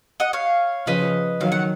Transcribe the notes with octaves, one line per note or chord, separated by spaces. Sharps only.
D#5 F#5
C#5 F5
C#3 F3 B4 D#5
D#3 F#3 F5
F#5